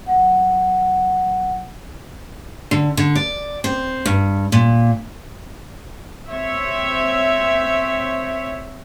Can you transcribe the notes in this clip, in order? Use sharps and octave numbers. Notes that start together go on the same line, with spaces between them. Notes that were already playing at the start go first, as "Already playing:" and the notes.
F#3 F#5
D3
D3
D5
C4
G2
A#2
C4 C#5 E5